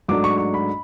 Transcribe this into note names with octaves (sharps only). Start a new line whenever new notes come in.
G#2 F#3 A3 D4 D6
C#6
C#6
B5